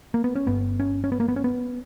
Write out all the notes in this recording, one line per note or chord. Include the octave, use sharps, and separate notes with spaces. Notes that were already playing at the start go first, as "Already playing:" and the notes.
A#3
B3
C#4
G1 G2 B3
C#4
C#4
B3
A#3
B3
C#4
B3